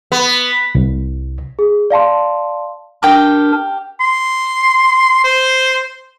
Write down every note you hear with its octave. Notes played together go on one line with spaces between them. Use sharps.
B3
C2
G#4
D5 F5 A5 C6
D4 G4 A#4 G5 D6
C6
C5